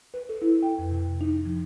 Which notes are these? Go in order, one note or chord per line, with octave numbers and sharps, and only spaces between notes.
B4
A4
E4
G5
F2
C3
D#4
F3